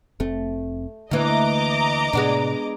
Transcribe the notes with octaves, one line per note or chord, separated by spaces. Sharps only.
F1 A3 C4
D2 D3 E3 A#3 D#5 A#5 D6
A2 C3 G#3 B3 D4